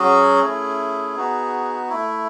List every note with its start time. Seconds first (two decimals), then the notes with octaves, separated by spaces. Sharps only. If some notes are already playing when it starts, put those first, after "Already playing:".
Already playing: F#3 C#4 F#4 G#4
0.42 A3 C#4 E4
1.16 B3 D#4 F#4
1.89 A3 E4